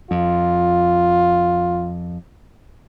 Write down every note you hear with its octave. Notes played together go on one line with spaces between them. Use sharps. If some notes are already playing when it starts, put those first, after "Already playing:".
F2 F4